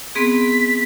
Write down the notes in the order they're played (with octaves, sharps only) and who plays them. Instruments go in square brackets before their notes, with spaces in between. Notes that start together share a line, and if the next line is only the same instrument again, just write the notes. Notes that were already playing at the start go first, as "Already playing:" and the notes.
[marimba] B3 C4 G#4 [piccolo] B6